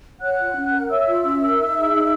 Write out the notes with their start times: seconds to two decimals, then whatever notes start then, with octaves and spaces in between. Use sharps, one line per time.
0.21 C#5 F#5 F#6
0.38 F4
0.55 C#4
0.72 A#4
0.89 C#5 E5 E6
1.07 F4
1.24 C#4
1.41 A#4
1.59 D#4
1.75 G#4
1.93 D#4